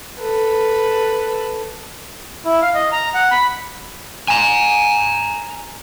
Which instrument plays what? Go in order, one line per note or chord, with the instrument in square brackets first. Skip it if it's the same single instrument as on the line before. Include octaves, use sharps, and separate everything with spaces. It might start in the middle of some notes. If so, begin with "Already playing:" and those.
[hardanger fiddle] A4 B4
[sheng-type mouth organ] E4
F5
D#5
A#5
F#5
B5
[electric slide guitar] G#5 A#5